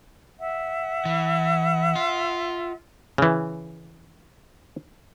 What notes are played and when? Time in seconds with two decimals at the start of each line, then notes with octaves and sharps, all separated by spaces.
0.39 E5 F#5
1.05 E3
1.96 F4
3.18 C#3 E3